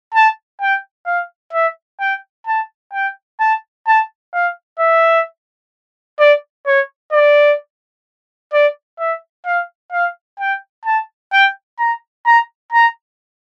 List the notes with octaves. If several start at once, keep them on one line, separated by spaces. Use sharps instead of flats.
A5
G5
F5
E5
G5
A5
G5
A5
A5
F5
E5
D5
C#5
D5
D5
E5
F5
F5
G5
A5
G5
A#5
A#5
A#5